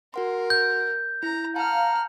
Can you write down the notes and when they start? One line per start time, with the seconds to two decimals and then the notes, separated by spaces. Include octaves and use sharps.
0.14 F#4 A#4 F#5 C6
0.50 G6
1.23 E4 A#5
1.56 F5 F#5 A5 A#5 F6